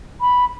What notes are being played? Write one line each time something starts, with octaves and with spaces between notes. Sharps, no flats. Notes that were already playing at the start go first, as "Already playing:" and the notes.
B5